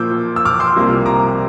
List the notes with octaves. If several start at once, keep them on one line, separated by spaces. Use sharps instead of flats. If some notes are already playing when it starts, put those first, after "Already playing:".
Already playing: A#2 F3 A#3 D6 E6 G6
E6
D6 F6
C6 E6
C2 C3 F3 A#3
A#5 D6